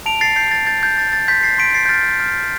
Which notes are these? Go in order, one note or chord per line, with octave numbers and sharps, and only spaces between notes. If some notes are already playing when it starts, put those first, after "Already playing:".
A5 D7 F7
A6 C7
G6 A6 C7
A6
G6 A6
G6
A5 A6
A6
C6 G6 B6
A6 C7
C6 B6 D7
A6 C7
G6
F6 A6
F6